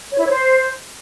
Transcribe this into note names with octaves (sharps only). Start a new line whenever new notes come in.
C#5
E4
C#5
C5